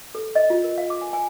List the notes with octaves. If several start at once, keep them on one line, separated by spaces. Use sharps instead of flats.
A4
D#5
F4
A#4
F5
D6
G#5
G#5